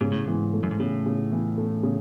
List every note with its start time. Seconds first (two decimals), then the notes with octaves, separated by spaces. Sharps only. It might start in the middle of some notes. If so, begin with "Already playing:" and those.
0.01 G#2 C#3
0.12 A2
0.24 G#2 E3
0.53 A3
0.63 F#2
0.71 G#2
0.80 A2 C#3
1.06 C#3
1.32 E3
1.58 A3
1.83 C#3